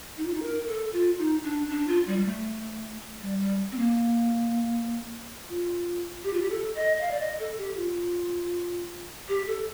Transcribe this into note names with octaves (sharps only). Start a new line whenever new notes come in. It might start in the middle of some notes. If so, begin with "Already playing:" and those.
D#4
F4
D#4
A#4
A4
F4
D#4
D4
D4
F4
G3
G3
A3
G3
G3
C4
A#3
F4
G4
F4
G4
A4
D#5
D#5
F5
D5
D#5
A4
G4
F4
G4
A4